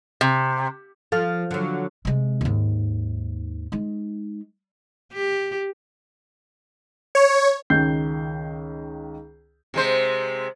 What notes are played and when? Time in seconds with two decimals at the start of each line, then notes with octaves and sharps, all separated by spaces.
0.21 C3
1.12 F3 A4 F5 F6
1.51 D3 F#3
2.05 C3 G#3
2.41 D#2 G#2
3.72 G#3 D#4
5.13 G4
7.15 C#5
7.70 C#2 D#3 G6 C7
9.74 C3 G#3 C5